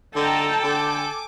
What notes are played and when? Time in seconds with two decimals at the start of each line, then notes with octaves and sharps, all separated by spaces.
0.16 D3 A4 D#5 G5 A5 A#5
0.64 D3 G#5 D6